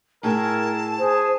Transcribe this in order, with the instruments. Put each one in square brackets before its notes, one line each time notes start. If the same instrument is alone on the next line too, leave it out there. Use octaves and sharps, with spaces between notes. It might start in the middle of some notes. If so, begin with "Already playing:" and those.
[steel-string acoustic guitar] A2 E4 G#4 [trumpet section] A#4 [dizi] A5
[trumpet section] G#4 [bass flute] C5